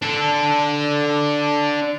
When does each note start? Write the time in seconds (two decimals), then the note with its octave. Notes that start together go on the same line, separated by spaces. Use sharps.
0.02 D4 A4